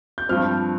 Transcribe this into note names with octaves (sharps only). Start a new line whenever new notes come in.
G6
G2 F3 C4 F6